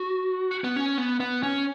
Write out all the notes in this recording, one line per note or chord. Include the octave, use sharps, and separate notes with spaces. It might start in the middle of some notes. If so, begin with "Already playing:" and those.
Already playing: F#4
B3
C#4
B3
B3
C#4